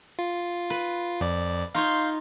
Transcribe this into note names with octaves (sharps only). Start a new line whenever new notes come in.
F4
B4
F2 D5
D#4 F4 C#5 F5 C6 G6